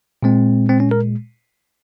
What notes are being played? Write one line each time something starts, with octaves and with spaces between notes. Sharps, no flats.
A#2 G#3 C4
C4
C#4
A#4